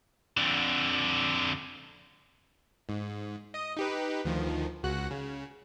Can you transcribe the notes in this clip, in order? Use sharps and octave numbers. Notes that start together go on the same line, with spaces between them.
F2 D3
G#2
D#5 D#6
D#4 G4 B4
D2 D#3 F3
C#2 F#4 F#6
C#3